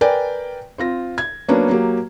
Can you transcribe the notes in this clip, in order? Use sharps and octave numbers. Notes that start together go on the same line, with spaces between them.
A#4 B4 D5 G5 G#5
C4 F4 A#6
G#6
F#3 A#3 B3 C#4 D4
F#3 A#3 G4